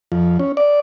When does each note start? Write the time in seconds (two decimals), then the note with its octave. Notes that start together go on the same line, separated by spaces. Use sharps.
0.12 F2
0.39 C#4
0.57 D5